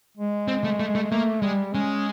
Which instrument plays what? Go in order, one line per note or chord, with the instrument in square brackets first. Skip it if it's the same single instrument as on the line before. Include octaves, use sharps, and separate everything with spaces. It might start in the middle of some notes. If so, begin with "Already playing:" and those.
[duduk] G#3
[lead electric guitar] C4
A3
A3
A3
[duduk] A3 [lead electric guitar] A#3
[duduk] G3 [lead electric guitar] G#3
[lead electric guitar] G#3 [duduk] C#4